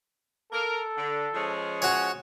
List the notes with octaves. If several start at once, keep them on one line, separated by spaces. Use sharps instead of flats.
A4 A#4
D3
F3 G#3 C#4
F#4 C#5 G#5